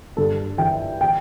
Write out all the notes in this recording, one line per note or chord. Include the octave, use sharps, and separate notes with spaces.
G2 A4
E3 G5
G5